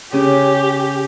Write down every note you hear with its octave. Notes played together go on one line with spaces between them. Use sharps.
C#3 C#4 G4